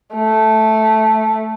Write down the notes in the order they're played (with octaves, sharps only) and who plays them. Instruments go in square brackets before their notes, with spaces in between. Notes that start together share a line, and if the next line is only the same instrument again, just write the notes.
[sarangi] A3